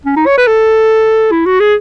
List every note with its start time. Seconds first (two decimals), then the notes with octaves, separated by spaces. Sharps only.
0.05 C#4
0.16 D#4
0.26 C#5
0.38 B4
0.47 A4
1.32 E4
1.46 F#4
1.60 G#4